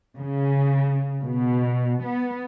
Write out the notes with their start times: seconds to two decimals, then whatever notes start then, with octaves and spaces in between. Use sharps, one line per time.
0.17 C#3
1.23 B2
2.03 B3